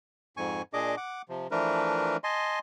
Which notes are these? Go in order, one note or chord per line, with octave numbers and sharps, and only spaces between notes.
F2 G#2 G#5 C#6
A#2 D4 G#4 D#5 D6
F#5 D6
C3 F3
E3 F3 A3 D4 A#4 B4
D#5 G#5 A5 C6